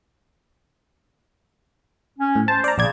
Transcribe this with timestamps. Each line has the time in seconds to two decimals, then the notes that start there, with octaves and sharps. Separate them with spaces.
2.19 C#4
2.36 A2
2.48 C5 A5
2.64 D5 A#5
2.78 A#1 C#3 D5 G#6